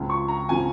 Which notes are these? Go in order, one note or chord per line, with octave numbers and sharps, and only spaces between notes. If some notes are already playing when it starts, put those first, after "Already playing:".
Already playing: C#2 C#3 F3
C#6
A#5
C#3 F3 G#5